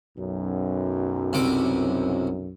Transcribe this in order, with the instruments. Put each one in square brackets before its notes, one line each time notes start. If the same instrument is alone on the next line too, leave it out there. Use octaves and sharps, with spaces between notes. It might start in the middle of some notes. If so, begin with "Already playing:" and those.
[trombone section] B1 F#2
[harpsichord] C2 C3 D6